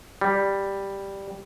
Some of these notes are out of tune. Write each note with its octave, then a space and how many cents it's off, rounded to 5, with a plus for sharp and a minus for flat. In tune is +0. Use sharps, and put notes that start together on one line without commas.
G3 +0